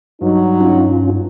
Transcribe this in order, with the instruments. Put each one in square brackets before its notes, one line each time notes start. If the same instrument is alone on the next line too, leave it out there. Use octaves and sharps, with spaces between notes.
[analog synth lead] G2 [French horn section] F#3 D#4
[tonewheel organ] C#4 F4